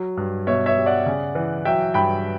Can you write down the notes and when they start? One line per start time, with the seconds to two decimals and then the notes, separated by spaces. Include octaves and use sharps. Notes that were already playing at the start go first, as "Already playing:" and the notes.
Already playing: F#3
0.17 G2
0.47 B2 C#5 E5
0.66 C#5 E5
0.77 G3
0.86 D5 F#5
1.06 C#3
1.35 E3
1.65 F#3 E5 G5
1.94 G2 G5 B5